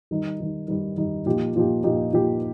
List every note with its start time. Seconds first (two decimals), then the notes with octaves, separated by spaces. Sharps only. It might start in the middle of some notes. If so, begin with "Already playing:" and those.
0.11 D#3 G3 D#4
0.40 D#3 G3 D#4
0.68 D#3 G3 D#4
0.97 D#3 G3 D#4
1.26 A#2 F3 D#4 G4
1.56 A#2 F3 D#4 G4
1.84 A#2 F3 D#4 G4
2.13 A#2 F3 D#4 G4